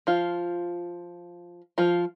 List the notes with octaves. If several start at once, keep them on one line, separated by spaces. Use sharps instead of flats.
F3 F4
F3 F4